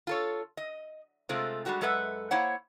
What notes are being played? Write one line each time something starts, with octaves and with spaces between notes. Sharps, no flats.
F4 A4 C#5
D#5
C3 G#3 A3 C4 F4
G3 G#3 C#4 F#4 G4
F#2 G#3 A4 B4 E5 F#5
A#3 E4 C5 C#5 F#5